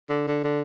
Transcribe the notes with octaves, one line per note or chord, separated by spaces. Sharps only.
D3
D3
D3